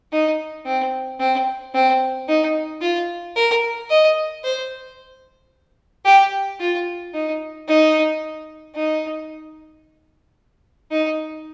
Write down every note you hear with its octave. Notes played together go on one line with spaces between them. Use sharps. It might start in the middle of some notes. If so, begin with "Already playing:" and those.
D#4
C4
C4
C4
D#4
F4
A#4
D#5
C5
G4
F4
D#4
D#4
D#4
D#4